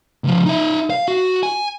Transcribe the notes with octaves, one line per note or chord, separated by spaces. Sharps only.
C#2 F3
D#4 E5
F5
F#4
G#5